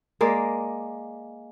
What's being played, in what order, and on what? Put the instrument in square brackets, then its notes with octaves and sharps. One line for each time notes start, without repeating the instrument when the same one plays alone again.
[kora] G#3 A#3 D5